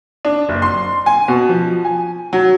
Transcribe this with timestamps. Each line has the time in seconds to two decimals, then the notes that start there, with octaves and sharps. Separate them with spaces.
0.25 D4
0.49 F#1
0.62 C6
1.06 G#5
1.28 B2
1.49 F3
1.85 G#5
2.33 F#3